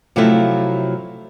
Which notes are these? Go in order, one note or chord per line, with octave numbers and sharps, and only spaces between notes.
C3 F3 F#3 A3 E4 F4